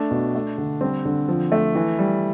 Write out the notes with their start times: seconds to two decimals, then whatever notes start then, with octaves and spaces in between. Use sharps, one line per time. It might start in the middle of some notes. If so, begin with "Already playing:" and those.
Already playing: A3 D4
0.11 B2
0.35 A3
0.58 D3
0.81 G3 C4
1.05 D3
1.29 F3
1.52 A3
1.75 E3
1.99 G3